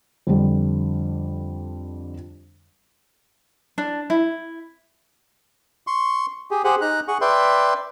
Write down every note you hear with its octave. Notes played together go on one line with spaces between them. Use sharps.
F2 D3 F3 G3
D4
E4
C6 C#6
G4 G#4
G4 G#4 C5 F#5
D#4 A#5 F#6
G#4 F#5 C#6
B4 D5 E5 G5 C6